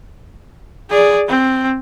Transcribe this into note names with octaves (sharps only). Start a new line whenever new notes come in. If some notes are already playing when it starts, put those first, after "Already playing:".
G#4 D5
C4